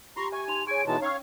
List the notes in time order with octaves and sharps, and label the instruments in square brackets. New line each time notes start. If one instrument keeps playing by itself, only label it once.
[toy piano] F4 [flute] G4 [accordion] A#5 C6 [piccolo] C#6
[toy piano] E5 [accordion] G#5 [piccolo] C#6
[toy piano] D#4 C6 [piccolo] F7
[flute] G#4 [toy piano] C#5 C#6 [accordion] G#5 [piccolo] D7
[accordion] B2 E3 G#3 [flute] D#4 [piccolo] A5
[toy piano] C#4 E6 [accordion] C#5 F5 [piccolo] C#6